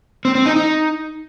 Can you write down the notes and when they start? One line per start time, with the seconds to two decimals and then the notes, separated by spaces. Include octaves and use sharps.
0.25 C4
0.35 C4
0.46 D#4
0.56 D#4